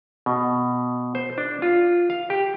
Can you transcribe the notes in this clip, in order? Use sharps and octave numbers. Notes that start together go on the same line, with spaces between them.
B2
C5
D4
F4
F5
G4